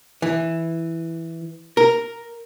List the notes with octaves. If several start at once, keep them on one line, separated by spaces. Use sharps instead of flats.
E3
A#4